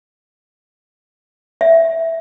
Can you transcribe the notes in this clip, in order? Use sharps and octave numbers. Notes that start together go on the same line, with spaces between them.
E5